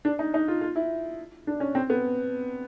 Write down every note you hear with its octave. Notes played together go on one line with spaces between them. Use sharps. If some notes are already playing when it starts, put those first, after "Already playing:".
D4
D#4
D#4
F4
F4
E4
D4
C#4
C4
B3